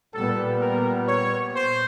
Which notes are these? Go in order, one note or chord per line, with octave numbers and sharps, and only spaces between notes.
A#2 G3 B3 A4
A#4
C#5
C5